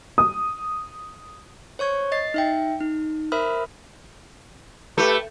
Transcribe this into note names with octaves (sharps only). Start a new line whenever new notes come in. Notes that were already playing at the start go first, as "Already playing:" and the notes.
D#6
C5 C#5 C#6 G#6
D#5 A6 C7
D#4 E5 G5
D#4
A#4 C5 E5 B5 D#6 F6
A3 G4 A4 B4